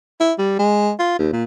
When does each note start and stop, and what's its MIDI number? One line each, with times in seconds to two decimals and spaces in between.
0.20 0.33 64
0.39 0.55 55
0.59 0.92 56
1.00 1.15 65
1.19 1.30 39
1.33 1.44 46